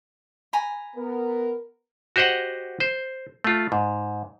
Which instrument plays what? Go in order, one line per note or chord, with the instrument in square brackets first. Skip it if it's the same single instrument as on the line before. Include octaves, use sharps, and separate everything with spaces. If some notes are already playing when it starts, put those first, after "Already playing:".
[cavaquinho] G#5 A#5 B5
[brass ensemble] B3 A#4
[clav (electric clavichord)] F#4 G4 C5 D#5 F#5
C5
A3 F4
G#2